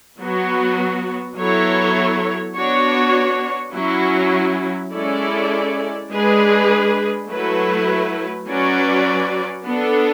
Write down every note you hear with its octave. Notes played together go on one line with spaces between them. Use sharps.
F#3 B3 F#4
F#3 B3 E4 A4 C#5
B3 D4 F#4 C#5
F#3 C#4 E4
G#3 C#4 E4 A4 D5
G#3 D4 G#4 B4
F#3 A3 E4 B4
F#3 C#4 F#4 B4 D5
B3 D4 A4